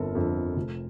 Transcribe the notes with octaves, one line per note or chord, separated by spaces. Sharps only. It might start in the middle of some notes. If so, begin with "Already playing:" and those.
Already playing: G1 F2 D3 A4 A#4
F2 D3
F1